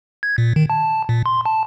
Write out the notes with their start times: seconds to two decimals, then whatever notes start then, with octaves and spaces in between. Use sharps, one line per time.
0.23 G#6
0.38 A#2
0.56 D#3
0.70 A5
1.09 A#2
1.26 C6
1.45 A5